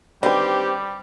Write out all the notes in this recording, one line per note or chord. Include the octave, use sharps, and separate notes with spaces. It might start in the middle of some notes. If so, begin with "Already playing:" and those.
D3 D#3 G3 C4 G4 B4